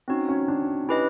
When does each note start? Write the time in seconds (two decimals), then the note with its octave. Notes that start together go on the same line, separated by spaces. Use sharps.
0.08 C4 C#4 D#4 F#4
0.29 C#4
0.48 D4
0.89 C#4 E4 G4 B4 D#5